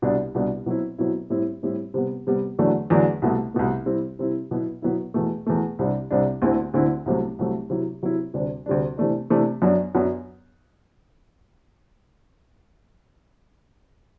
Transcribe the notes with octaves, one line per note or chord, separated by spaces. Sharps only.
C2 B2 G3 D4
C2 B2 G3 D4
B2 F#3 C4 E4
B2 F#3 C4 E4
A2 G3 C4 E4
A2 G3 C4 E4
C3 G3 B3
C3 G3 B3
E2 D3 F#3 A3 D4
E2 D3 F#3 A3 D4
C2 B2 A3
C2 B2 A3
C3 G3 C4 E4
C3 G3 C4 E4
B2 F#3 B3 E4
B2 F#3 B3 E4
E2 B2 A3
E2 B2 A3
C2 C3 G3 D4
C2 C3 G3 D4
D2 D3 A3 C4 E4
D2 D3 A3 C4 E4
C2 C3 F#3 A3
C2 C3 F#3 A3
C3 F#3 C4 E4
C3 F#3 C4 E4
D2 C3 G3 D4
D2 C3 G3 D4
C3 E3 A3 D4
C3 E3 A3 D4
F#2 F#3 B3 D4
F#2 F#3 B3 D4